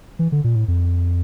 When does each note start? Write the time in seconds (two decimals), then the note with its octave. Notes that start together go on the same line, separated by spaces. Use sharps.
0.19 E3
0.32 D3
0.44 A#2
0.56 A2
0.68 F2